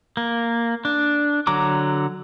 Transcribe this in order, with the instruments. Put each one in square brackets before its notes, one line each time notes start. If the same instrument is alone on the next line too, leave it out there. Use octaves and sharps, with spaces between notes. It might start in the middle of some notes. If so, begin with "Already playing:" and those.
[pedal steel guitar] A#3
D4
D3 F#3 A#5 D6